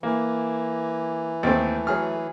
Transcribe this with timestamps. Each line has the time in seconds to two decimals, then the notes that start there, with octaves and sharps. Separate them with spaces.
0.03 E3 A#3
1.43 D#2 A3 C4 A6
1.87 F#3 G#4 F6